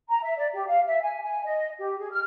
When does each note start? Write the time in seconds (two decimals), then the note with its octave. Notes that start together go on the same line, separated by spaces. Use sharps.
0.09 A#5
0.22 E5
0.37 D5
0.53 G4
0.66 F5
0.86 E5
1.01 G#5
1.23 G#5
1.43 D#5
1.78 G4
1.98 G#4
2.10 F6